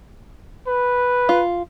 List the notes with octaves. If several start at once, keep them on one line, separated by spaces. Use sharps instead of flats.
B4
F4